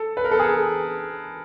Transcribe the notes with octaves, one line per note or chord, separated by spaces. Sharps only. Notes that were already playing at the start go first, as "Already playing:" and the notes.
Already playing: A4
B4
A#4
A4
G#4